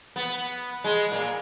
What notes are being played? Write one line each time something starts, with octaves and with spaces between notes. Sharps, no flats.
B3
G#3
A#2